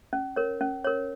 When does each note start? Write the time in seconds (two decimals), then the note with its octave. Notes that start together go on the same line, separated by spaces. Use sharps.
0.13 C#4
0.36 A#4 C#5
0.61 C#4
0.85 A#4 C#5